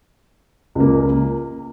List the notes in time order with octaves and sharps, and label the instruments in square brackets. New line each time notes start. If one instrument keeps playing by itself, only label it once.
[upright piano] C#2 C#3 A#3